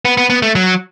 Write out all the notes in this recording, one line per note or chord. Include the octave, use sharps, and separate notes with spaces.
B3
B3
B3
A3
F#3